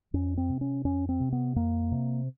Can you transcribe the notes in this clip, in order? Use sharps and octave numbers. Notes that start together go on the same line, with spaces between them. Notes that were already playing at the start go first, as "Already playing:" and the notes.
F2 C#4
C4
C3
C#4
F2 C#4
C4
C3
B3
F2 A#3
C3